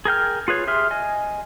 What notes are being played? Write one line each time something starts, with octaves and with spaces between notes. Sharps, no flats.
G#4 A#4 G5 F6
F4 G#4 B4 C#5
G4 G#4 E5 C6 F6
D#5 G#5